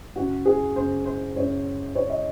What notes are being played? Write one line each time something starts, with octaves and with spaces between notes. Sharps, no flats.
F#2 C#3 F#4
G#4
F#2 C#3 C5
C5
F#2 C#3 C#5
F#2 C#3 C#5
D#5